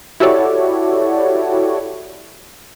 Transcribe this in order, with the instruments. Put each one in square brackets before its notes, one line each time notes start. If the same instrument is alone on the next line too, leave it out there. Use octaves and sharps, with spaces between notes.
[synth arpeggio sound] E4 F#4 G4 A4 C#5 D5